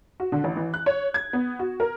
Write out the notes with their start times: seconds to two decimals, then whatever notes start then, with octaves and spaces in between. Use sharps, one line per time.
0.20 F#4
0.32 D3
0.44 A1
0.56 E3
0.74 F#6
0.86 C#5
1.14 G#6
1.33 B3
1.59 F#4
1.80 A#4